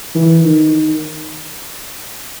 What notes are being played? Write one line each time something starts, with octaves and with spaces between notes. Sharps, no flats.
E3
D#3